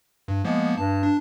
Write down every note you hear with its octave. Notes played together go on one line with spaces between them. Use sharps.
G2
F3 G#3 A#3 B3
G2 A5
D4